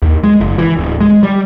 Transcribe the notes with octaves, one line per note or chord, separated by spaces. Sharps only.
D#2
G#3
F#1
E3
D1
G#3
G3